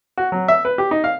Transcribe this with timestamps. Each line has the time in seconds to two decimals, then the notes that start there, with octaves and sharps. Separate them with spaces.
0.18 F#4
0.32 F#3
0.48 E5
0.65 B4
0.78 G4
0.91 D#4
1.04 F5